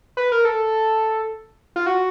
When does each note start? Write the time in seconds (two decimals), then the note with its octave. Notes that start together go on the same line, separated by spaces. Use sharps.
0.17 B4
0.32 A#4
0.45 A4
1.76 F4
1.86 F#4